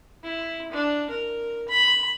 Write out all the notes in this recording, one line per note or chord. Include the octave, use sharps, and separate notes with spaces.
E4
D4
A#4
B5